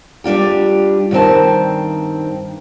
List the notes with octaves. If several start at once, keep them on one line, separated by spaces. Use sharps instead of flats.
G3 D4 F4 G4
G2 D#3 C4 A5